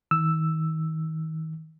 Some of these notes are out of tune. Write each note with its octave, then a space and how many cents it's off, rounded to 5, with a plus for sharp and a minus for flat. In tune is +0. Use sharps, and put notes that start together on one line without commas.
D#3 +35 E6 +0